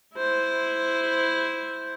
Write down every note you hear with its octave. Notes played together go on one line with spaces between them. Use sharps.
E4 C5